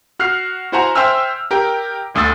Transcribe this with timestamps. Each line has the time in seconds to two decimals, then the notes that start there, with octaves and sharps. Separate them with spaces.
0.19 F#4 F6 F#6 C7
0.72 E4 F#4 C5 F#5 G#5 A#5
0.95 C5 E5 G5 G#5 E6 F6
1.51 G4 A#4 G5
2.15 G1 D2 D#6 E6 A6